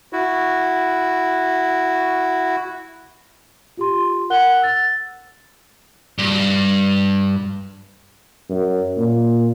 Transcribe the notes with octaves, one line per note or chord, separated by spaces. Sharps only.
E4 F#4
F4 G4 C6
A#4 F#5 F#6 G7
E6 A6
G2
F#2
A#2